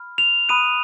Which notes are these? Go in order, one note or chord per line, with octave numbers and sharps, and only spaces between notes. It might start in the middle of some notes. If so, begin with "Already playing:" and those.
Already playing: B5 F6
F7
B5 D#6 F#6 D#7